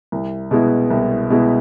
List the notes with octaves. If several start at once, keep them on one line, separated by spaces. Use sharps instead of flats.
C2
B2 G#3 B3 E4
C2
B2 G#3 B3 E4